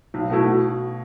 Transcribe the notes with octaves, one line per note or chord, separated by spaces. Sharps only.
B1
B2 A3 E4
B2